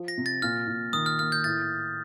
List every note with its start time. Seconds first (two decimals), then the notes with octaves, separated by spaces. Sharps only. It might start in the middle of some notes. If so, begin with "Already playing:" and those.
Already playing: F3
0.08 A#6
0.18 C3
0.26 A6
0.42 A#2 F6
0.67 A#2
0.93 D#3 D#6
1.06 F6
1.19 A#3 F6
1.32 G6
1.44 A2 A6